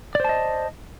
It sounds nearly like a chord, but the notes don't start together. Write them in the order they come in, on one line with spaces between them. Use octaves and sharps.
D5 C5 A5 D#5